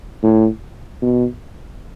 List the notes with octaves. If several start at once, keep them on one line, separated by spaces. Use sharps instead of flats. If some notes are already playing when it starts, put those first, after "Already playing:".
A2
B2